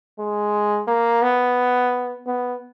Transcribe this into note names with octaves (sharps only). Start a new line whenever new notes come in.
G#3
A#3
B3
B3